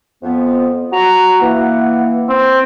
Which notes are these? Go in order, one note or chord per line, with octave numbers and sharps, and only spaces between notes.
F2 B3
F#4 F#5 A#5
E3 A#3
C4